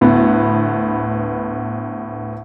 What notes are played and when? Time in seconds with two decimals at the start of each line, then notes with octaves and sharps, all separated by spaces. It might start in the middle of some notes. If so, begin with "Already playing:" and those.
0.01 D2 A2 B3